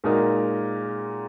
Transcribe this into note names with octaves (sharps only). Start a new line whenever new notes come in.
A#2 G#3 D#4 F#4 A#4